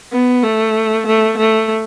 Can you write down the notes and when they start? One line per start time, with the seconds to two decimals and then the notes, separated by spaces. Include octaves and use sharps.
0.12 B3
0.43 A3
1.06 A3
1.38 A3